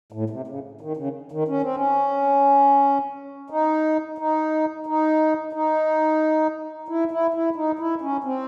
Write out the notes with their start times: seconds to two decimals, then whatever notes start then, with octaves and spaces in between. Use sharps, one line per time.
0.12 A2
0.30 C3
0.47 C#3
0.81 D#3
0.97 C#3
1.32 D#3
1.48 C#4
1.62 C4
1.76 C#4
3.50 D#4
4.18 D#4
4.86 D#4
5.53 D#4
6.88 E4
7.11 E4
7.34 E4
7.56 D#4
7.79 E4
8.01 C#4
8.24 C4